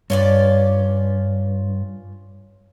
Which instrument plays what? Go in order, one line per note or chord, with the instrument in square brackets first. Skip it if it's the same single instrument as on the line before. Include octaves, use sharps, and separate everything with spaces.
[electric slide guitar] G2 [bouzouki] C#4 F4 D5